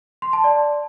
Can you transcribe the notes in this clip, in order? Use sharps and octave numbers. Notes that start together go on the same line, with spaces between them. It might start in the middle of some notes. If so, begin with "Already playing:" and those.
C6
A5
D5